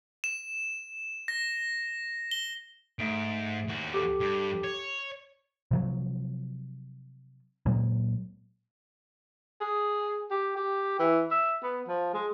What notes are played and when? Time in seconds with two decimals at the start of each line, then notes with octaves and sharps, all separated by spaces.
0.24 E7
1.28 A#6
2.31 G7
2.99 G#2 A3 D7
3.68 D#2 F#4
3.94 G4 A4
4.20 G2
4.64 C#5
5.71 C3 F3 F#3
7.66 A#2 F#3 G#3 A#3
9.61 G#4
10.31 G4
10.56 G4
10.99 E3
11.31 E5
11.63 B3
11.88 F3
12.14 G#3